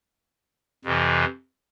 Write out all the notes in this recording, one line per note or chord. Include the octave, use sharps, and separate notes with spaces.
F2 C3 E3